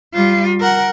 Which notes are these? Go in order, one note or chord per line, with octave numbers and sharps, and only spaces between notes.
G3 F4
A#4 F#5